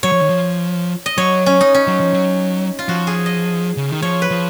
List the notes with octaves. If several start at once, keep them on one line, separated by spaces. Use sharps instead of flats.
F#3 C#5
F3
D#3
F3
D#5
F#3 C#5
C#4
D#4
C#4
F#3
F3
F#3
F4
F3 F#4
G#4
D#5
C#3
D#3
F3 C#5
B4
F3